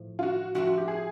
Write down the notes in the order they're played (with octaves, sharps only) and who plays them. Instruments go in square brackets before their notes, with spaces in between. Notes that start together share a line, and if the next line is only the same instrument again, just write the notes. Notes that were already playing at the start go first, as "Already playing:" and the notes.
Already playing: [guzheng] A2 F3
[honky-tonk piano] F4
F#4
[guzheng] C3 F3 A3 C4 F4 [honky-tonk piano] F#4
[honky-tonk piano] F#4
G4
G#4